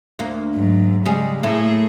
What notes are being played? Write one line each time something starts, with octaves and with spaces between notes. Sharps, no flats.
D2 A#3
G#2 F#3
C#3 G3 G#3 G#4
A2 A3 A#3 E4 G#4